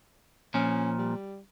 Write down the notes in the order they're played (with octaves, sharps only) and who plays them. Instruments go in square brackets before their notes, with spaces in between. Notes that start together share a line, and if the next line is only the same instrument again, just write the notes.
[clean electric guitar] A#2 F3 [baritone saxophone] C#4
[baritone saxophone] G3